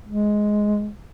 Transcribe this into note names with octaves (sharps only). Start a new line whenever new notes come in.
G#3